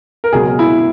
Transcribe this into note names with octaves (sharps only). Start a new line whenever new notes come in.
A#4
C#2 B2 F#3 G#4
E4